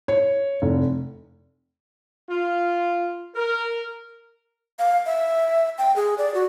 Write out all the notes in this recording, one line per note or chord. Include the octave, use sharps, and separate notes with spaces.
C#5
F1
F4
A#4
F5
E5
G5
G#4
D5
F#4